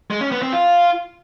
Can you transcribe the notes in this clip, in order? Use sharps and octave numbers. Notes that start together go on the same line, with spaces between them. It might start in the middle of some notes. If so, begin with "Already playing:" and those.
G#3
C#4
B3
C4
F4